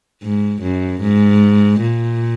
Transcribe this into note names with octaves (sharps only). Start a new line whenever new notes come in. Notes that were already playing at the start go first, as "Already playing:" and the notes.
G#2
F#2
G#2
A#2